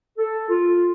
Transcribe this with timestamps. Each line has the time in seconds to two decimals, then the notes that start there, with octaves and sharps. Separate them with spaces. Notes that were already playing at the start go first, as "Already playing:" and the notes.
0.18 A4
0.49 F4